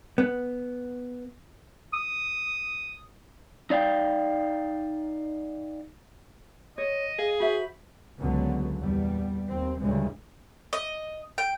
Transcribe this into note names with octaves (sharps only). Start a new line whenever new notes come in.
B3
D#6
D#4 D5 F5 G5
C#5 D#5
G#4 F5
F#4 C5 E5 B5
C#2 D3 F#3 B3
E2 A#2 G3 B3
D#2 C4
D2 A2 C#3 E3 G3 G#3
D#5
G5